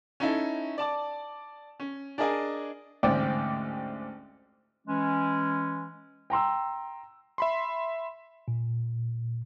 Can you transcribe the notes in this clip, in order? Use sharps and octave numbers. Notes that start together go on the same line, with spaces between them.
C#4 D#4 E4 A4
D5 A5 D6
C#4
D4 G#4 A#4 D#5 G#5 A5
A1 D2 G#2 C4 D5 G5
E3 G#3 C#4
G5 A#5 C6 E6
E5 B5 C6
A#2